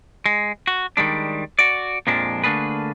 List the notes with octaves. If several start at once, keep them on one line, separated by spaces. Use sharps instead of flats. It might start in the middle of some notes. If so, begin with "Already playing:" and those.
G#3
F#4
D#3 G3 G#3 D4
F#4 D5
F2 A#2 F3 G#3 D4
D3 A3 A#3 D4 G#4 B4